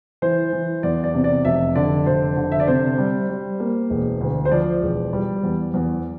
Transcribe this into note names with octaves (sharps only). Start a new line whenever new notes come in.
E3 C5
E3
E2 D5
D5
C3
D5
F1 E5
D3 D5
F1 C5
D3
E5
D5
C3 C5
G3
G3
A#3
E1
D2
C5
F3 D5
E1
G3
E2
E2